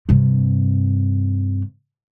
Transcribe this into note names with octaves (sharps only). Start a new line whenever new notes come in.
G2 C3